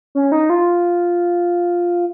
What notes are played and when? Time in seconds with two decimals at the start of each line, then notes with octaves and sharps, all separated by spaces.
0.15 C#4
0.32 D#4
0.50 F4